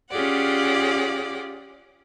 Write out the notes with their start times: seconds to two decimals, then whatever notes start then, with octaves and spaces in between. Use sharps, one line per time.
0.11 C#4 F4 G4 G#4 D5 F#5